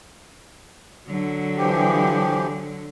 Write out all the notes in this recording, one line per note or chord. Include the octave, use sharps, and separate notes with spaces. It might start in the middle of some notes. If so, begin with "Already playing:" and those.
D3 F#3
E3 F3 G4